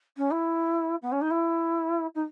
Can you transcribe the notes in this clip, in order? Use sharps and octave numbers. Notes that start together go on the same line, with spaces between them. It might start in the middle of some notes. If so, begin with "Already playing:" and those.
C#4
E4
B3
C#4
D#4
E4
D#4